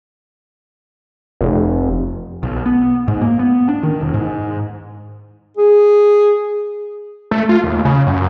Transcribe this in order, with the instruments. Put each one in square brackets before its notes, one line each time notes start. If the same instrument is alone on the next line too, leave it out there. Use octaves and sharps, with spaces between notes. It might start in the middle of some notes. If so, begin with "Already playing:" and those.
[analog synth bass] F1
[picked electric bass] B1
B3
G#2
A#3
B3
D4
D#3
E1
G#2
[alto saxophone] G#4
[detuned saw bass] A3
F4
D#2
C#3
F#2